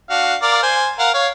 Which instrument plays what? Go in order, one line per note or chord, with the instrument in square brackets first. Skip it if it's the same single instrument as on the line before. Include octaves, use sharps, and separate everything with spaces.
[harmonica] D4 F#4 F5
A#4 D5 F5
C5 G#5
A#4 F5 F#5
C#5 F5